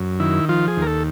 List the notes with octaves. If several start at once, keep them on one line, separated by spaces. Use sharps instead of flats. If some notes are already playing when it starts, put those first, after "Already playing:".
Already playing: F#2
D#3 E4
F3 F4
G#4
D#2
A#4
A4